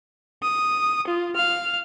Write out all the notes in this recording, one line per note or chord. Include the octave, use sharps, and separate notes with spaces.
D#6
F4
F5 F6